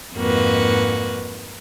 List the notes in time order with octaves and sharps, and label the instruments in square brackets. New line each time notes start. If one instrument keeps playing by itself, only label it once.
[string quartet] F2 G#2 A#3 F#4 B4